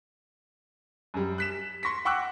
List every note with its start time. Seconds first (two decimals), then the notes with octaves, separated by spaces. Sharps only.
1.14 F#2 G3
1.38 F#6 B6 E7
1.83 C6 C#6 A#6 B6
2.05 F#5 G5 C#6 D6 E6 F#6